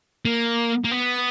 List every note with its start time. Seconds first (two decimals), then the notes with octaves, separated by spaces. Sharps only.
0.25 A#3
0.84 A#3
0.91 B3